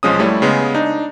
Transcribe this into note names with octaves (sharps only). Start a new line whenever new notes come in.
B1 F3 G#3 C#4 D#6
G3 A3 E4 C#5
C#3 G#3 B3
D4 D#4